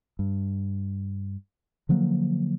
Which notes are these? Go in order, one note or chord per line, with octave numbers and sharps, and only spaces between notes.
G2
D3 F3 F#3 A#3